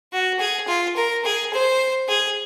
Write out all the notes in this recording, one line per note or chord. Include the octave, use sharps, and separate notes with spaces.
F#4
G#4
F4
A#4
G#4
C5
G#4